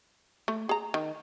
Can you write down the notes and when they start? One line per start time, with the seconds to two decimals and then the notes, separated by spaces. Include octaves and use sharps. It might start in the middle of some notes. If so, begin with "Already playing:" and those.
0.48 A3
0.69 G#4 A#5
0.94 D#3